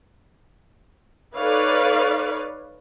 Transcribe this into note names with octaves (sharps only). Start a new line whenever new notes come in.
D#4 A4 B4 C#5 D5 F5